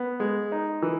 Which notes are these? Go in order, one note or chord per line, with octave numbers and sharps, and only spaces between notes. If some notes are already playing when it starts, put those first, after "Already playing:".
Already playing: B3
G#3
D#4
E3